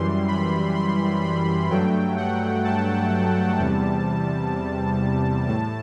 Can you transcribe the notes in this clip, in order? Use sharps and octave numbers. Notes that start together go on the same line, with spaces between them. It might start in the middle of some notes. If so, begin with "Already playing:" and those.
Already playing: F#2 E3 G3 C6
B5
C6
B5
G2 F#3 A3 G5
F#5
A5
E2 C3 G3
A2 A5